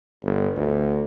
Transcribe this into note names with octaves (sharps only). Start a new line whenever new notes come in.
G1
D2